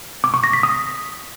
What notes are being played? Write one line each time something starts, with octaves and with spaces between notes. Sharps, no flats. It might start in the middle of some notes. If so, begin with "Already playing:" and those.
D6
C#6
A#6
B6
D#6